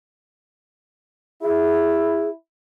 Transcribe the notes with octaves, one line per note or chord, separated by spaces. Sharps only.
E4 G#4